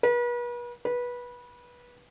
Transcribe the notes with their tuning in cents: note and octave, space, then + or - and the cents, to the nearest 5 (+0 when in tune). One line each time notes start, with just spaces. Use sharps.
B4 -40
B4 -20